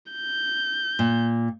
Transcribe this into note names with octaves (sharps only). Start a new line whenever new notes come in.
G6
A#2